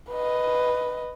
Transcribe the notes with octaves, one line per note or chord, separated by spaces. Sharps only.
B4 D#5